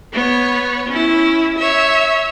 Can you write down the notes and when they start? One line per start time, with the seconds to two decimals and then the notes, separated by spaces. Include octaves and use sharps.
0.13 B3 C#5
0.89 C#4 E4
1.58 C#5 E5